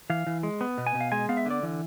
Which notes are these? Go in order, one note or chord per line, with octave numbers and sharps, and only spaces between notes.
E3 F5
E3
G#3
B3
B2
G#5
B2
F5
G#3 G#5
B3 F5
E5
D3 D5
E3